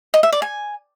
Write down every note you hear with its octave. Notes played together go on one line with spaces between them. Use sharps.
D#5
E5
D5
G#5